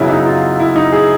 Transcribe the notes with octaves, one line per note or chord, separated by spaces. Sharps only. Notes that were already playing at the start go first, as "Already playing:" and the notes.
Already playing: F#2 C#3 F#3 B3 E4
D#4
F4
E4
D#4
G#4